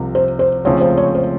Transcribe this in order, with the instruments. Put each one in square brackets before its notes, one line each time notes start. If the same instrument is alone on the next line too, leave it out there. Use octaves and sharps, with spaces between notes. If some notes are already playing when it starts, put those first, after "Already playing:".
Already playing: [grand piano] C2 C3 F3
[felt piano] C5
C5
[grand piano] C#2 C#3 F3 A3 C4 [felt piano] C#5
[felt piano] C5
C#5
C5